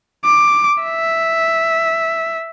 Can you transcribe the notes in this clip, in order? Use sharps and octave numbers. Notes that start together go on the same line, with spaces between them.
D6
E5